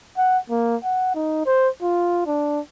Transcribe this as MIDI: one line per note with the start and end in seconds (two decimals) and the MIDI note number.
0.18 0.38 78
0.50 0.76 58
0.84 1.11 78
1.15 1.45 63
1.46 1.69 72
1.83 2.25 65
2.27 2.60 62